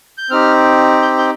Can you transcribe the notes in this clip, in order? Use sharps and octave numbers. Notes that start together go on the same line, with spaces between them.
G6
C4 D#4 G4 F6
G6
G6